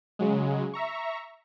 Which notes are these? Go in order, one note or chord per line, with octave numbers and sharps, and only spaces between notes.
C#3 F#3 G#3
E5 A#5 C#6